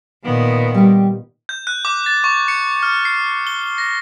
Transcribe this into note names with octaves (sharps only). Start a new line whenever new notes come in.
A#2 D#3 B3
G3 G4
G6
F#6
D6
A6
C#6
C#7
F6
C7
G7
A#6